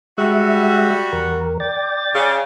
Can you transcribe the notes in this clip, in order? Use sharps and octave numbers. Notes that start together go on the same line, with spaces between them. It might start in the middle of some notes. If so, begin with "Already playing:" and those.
G3 G#3 F#4 E5
E2 A#4
D5 G5 A6
C#3